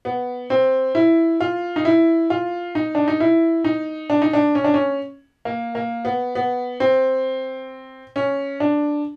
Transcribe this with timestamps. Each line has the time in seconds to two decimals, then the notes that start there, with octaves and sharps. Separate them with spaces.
0.05 B3
0.50 C4
0.95 E4
1.40 F4
1.76 D#4
1.85 E4
2.30 F4
2.75 D#4
2.95 D4
3.08 D#4
3.20 E4
3.64 D#4
4.10 D4
4.22 D#4
4.33 D4
4.55 C#4
4.64 D4
4.74 C#4
5.45 A#3
5.75 A#3
6.05 B3
6.35 B3
6.80 C4
8.16 C#4
8.60 D4